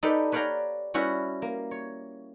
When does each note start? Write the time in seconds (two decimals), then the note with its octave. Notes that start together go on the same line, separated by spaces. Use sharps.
0.03 D#4 G4 A4 B4 D5
0.32 B4 C#5 D5 F5 G5 A#5
0.94 G3 C#4 E4 F#4 B4
1.42 A#3
1.71 C#5